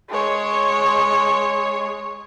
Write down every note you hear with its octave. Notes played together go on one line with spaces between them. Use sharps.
G#3 C#5